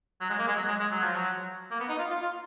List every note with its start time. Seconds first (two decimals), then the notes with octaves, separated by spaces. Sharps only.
0.21 F#3
0.30 G#3
0.39 A#3
0.48 G#3
0.57 F#3
0.68 G#3
0.80 G#3
0.91 F#3
1.03 F3
1.15 F#3
1.71 A#3
1.80 B3
1.89 D#4
1.98 F4
2.10 F4
2.22 F4